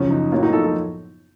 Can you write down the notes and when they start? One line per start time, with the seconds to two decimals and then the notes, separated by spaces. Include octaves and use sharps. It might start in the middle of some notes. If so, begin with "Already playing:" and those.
Already playing: F#2 C#3 F3 C#4
0.10 D#4
0.32 A2 F#3 A#3 C#4 F4
0.42 D#4 F#4
0.53 F4 A4
0.63 F4 A4